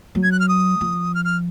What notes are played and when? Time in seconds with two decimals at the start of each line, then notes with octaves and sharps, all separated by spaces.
0.15 F#3
0.23 G#6
0.32 F#6
0.40 F6
0.49 D#6
0.81 F3
1.15 F6
1.25 F6